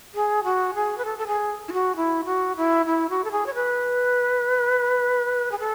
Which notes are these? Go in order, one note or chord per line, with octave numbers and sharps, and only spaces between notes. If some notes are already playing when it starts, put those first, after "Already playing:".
G#4
F#4
G#4
B4
A4
A4
G#4
E4
F#4
E4
F#4
E4
E4
F#4
A4
G#4
C#5
B4
G#4
A4